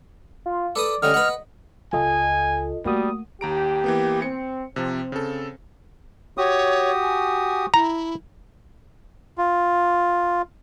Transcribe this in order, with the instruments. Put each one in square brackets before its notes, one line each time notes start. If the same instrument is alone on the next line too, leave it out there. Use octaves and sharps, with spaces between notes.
[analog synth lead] F4
[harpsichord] A4 B4 D#6 [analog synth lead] D5
[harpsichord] D3 G3 C#4 [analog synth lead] D#5 [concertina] F6
[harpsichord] B4 F#5
[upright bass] C#2 [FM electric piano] F4 A4 D#5 [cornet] G#5
[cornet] G3 [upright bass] A3 [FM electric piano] A#3 F#4 D#6
[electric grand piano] D#2 A#5 D7 [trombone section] G4
[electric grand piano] E3 A#3 B3
[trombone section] C4 [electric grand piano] C#7
[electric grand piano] C3 F3 [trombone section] C4
[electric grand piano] C#3 A4
[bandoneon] F#4 G4 D#6 [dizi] C#5
[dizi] G#5
[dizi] E4 [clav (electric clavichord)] A#5
[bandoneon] F4